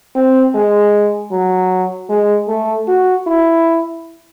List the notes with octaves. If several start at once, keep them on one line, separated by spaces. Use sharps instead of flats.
C4
G#3
F#3
G#3
A3
F#4
E4